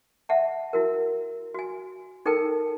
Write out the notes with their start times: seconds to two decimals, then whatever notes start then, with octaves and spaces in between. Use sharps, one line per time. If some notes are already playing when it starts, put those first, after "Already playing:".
0.29 E5 F#5 A5
0.73 E4 F#4 A#4
1.54 F#4 G#5
2.26 D#4 A4 A#4 G5 A5